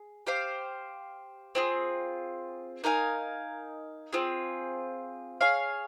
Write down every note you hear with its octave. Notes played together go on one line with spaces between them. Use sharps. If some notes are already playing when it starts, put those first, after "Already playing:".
Already playing: G#4
G4 C5 F5
C4 F4 G#4
D#4 A#4 F5 G#5
C4 F4 G#4
G#4 C#5 F5